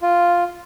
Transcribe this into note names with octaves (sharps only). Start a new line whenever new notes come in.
F4